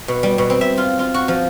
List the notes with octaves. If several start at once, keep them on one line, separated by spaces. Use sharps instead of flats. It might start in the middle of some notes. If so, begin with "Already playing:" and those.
B2
G3
B2
C4
E5
F4
F4
F#4
F3